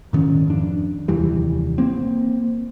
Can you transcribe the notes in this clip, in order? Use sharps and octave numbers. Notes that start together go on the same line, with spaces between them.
G#2 D#3 C#4
F2 D4
F1 D#2 E3 G3
A#3 C4